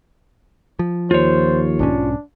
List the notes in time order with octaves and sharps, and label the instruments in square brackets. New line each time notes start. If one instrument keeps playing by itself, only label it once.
[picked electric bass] F3
[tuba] D#2 [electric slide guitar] F4 C#5 [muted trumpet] C5
[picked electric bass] B1 G#2 C#4 [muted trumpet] D4